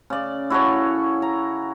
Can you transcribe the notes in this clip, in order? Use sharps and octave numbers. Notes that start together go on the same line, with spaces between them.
C#3 D5
E4 F#4 A4 C#5
A#5